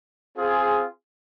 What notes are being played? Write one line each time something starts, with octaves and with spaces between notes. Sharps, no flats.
C4 F4 G#4